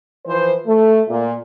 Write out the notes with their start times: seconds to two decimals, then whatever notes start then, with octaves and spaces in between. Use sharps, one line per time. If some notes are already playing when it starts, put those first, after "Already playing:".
0.27 E3 F3 C5
0.66 A3
1.08 A#2